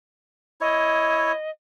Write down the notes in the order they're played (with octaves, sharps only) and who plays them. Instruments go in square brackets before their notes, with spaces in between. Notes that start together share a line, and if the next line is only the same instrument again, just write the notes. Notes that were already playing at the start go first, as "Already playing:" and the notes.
[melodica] E4 C#5 [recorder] D#5